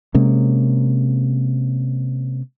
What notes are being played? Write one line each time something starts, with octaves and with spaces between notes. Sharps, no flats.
C3 G#3 A#3 C#4